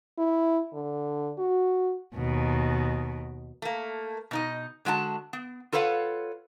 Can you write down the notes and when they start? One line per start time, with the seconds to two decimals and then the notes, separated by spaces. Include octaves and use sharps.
0.18 E4
0.73 D3
1.38 F#4
2.15 D#2 B2
3.62 A3 A#3
4.31 B2 D#4 D#5
4.85 D3 G#3 F#4 G5 A5
5.33 B3
5.72 F4 A4 B4 C#5 F5 F#5